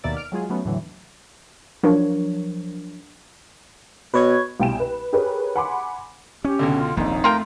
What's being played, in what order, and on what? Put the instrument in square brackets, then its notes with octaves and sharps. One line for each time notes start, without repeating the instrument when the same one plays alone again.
[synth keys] D#2 B2 A#3 D5 E5 A6
F6 D7
F#3 G#3 F4 G#4
F#3 A3 B3 C#4
E2 A2 D3 E3 F#3
[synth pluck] F3 F#3 D4 A#4 C#5
[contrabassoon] B2 [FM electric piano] B4 C#5 G#6
[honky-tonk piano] C2 B2 G5 G#5 E7
B4
G4 G#4 A#4 B4 C#5
F#5 G#5 B5 C6 D6
[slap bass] C#4 [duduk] G4
[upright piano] C#2 B2 D3
[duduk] F4
[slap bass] D#1 A#1 G#2 [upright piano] F2 [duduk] D#4
[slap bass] A3 [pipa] F4 A#4 G5